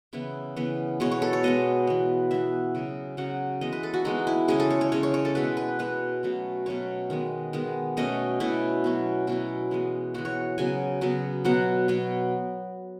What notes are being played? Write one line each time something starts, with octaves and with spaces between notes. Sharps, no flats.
C#3 E3 B3 E4
C#3 E3 B3
B2 G#3 B3 C#5
C#5
A4
C#5
B2 G#3 B3 D#5
E3 B3
E3 B3 E5
C#3 F#3 C#4
C#3 F#3 C#4 F#5
E3 G#3 B3 D#5
B4
A4
F#4
E3 G#3 B3 D#4
E4
C#3 G#3 C#4 G#4
A4
C#5
C#5
C#3 G#3 C#4 C#5
C#5
C#5
A4
B2 G#3 B3 B4
B4
B2 G#3 B3 B4
B2 F#3 A3 C#4
B2 F#3 A3 C#4 C#5
D#3 G#3 B3
D#3 G#3 B3
B2 A3 C#4 D#5
B2 A3 C#4 E4
B2 F#3 C#4
B2 F#3 C#4 E4
E3 G#3 B3
E3 G#3 B3 F#4
C#5
C#3 F#3 B3 G#5
C#3 F#3 B3
B2 F#3 B3 F#5
B2 F#3 B3